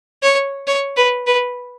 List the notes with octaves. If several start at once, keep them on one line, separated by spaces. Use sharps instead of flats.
C#5
C#5
B4
B4